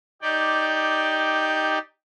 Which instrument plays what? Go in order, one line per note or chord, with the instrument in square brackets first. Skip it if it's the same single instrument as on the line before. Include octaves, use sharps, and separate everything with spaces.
[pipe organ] D#4 G4 D5 G5